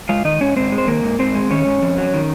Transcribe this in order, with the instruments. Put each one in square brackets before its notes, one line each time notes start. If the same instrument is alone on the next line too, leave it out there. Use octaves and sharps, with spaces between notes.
[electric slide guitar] G#3 F4 F5
D#3 D#4 D#5
G#2 C#4 C#5
G#2 C4 C5
G#3
C5
D#3 A#3 A#4
G#2
G#2 C4 C5
G#3
D#3 C#4 C#5
G#2
F2
F#3
D#3